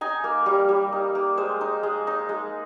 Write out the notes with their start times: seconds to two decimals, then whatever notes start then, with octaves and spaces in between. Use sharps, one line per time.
0.01 D#4 G#5
0.24 A#3
0.46 G3
0.69 G3
0.93 D#4
1.15 A#3
1.37 G#3 C5
1.61 D#4
1.83 G#3
2.07 D#4
2.29 G#3